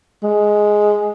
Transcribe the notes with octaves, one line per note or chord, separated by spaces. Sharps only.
G#3